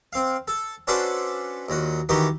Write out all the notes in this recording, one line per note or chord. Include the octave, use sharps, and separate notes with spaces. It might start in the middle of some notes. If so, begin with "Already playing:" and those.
C4 F5
A4
C#4 D4 F#4 A4 B4 C5
D#2 A#2 F#4
D#3 E3 D#4 F#4 G4